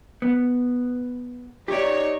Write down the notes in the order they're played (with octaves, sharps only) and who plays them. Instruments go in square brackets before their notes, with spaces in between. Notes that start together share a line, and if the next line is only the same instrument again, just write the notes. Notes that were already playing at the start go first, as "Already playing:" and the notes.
[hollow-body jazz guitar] B3
[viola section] D#4 C#5 [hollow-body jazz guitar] G4 D5